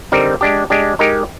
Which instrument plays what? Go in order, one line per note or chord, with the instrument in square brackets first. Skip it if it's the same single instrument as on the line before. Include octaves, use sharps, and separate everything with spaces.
[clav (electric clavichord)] D3 G3 C4 D#4 A#4
G#3 D4 G4
G#3 D4 G4
G#3 D#4 G4 A#4